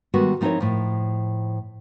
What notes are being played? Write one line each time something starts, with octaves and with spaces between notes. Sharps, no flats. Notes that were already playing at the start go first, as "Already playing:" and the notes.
D#3 G3 G#3 B3 F#4
F3 C4 D#4 E4 A#4 C#5
A2 F3